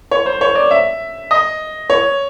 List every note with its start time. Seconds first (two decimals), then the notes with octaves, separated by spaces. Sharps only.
0.11 C#5
0.26 C5
0.41 C#5
0.55 D5
0.71 E5
1.31 D#5
1.90 C#5